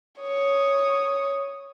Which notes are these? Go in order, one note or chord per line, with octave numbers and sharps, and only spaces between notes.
C#5 D#6